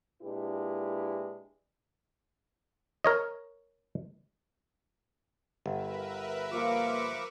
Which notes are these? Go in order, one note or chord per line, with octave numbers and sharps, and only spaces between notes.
A#2 G#3 D4 E4 G4 B4
A#4 C#5 D#5
G1 A#4 B4 E5
F3 A#3 F4 C#6 D6